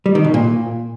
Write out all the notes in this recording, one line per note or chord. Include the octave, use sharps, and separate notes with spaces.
G3
D#3
B2
A#2